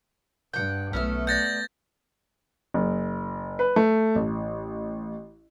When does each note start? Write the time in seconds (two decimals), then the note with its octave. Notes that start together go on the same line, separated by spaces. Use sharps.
0.53 G2 F#5 G5
0.93 B1 A3 B3 C#4 A4 E5 F6
1.27 D5 F#5 G6 A6 A#6
2.74 F#1
3.59 B4
3.76 A3
4.16 A1